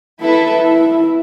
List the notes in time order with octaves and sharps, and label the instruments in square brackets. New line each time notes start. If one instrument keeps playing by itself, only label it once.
[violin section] E4 A4 E5 [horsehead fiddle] B4
[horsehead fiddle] E4